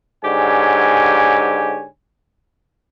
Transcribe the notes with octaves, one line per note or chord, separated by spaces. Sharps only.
G#2 D3 G4 C#5 G#5